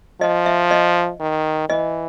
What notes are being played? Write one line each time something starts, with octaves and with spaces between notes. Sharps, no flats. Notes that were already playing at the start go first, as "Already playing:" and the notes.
F3 D#5
E5
D#5
D#3
E3 D#5